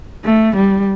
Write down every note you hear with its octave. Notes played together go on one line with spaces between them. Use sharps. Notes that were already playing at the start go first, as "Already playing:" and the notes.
A3
G3